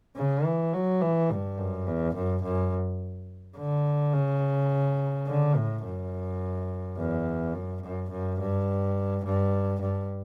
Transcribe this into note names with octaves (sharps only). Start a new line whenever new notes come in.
C#3
E3
F#3
E3
G2
F#2
E2
F#2
F#2
D3
C#3
D3
A2
F#2
E2
F#2
F#2
F#2
G2
G2
G2